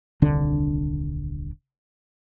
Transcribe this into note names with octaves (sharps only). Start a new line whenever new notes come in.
D#1 C2 D3 D4